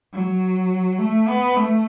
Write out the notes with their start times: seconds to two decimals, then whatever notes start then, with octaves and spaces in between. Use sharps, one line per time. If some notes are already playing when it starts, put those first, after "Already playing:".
0.14 F#3
0.99 A3
1.28 B3
1.57 A3